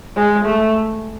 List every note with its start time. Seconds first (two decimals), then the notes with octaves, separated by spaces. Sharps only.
0.16 G#3
0.45 A3